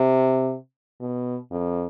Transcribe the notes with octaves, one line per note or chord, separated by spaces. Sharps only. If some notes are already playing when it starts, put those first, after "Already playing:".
Already playing: C3
B2
F2